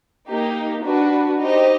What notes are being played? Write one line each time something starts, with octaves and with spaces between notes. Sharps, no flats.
A#3 D#4 G4
D4 F#4 B4
D#4 G4 C5 D#5